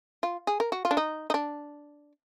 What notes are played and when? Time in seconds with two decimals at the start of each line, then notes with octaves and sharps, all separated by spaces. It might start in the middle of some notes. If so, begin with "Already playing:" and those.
0.23 F4
0.47 G#4
0.60 A#4
0.72 F#4
0.85 F4
0.91 D4
0.97 D#4
1.30 D#4
1.34 D4